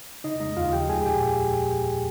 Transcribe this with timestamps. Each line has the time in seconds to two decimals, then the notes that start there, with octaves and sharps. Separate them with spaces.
0.24 C#3 D#4 D#5
0.40 G#3 D#4 D#5
0.57 D#2 F4 F5
0.73 F3 G4 G5
0.89 G#3 G#4 G#5
1.05 A#2 G4 G5